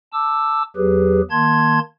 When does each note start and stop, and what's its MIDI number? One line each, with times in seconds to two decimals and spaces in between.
0.13 0.63 81
0.13 0.63 86
0.13 0.63 88
0.76 1.21 40
0.76 1.21 54
0.76 1.21 67
0.76 1.21 68
0.76 1.21 71
1.31 1.79 51
1.31 1.79 58
1.31 1.79 81
1.31 1.79 84
1.31 1.79 92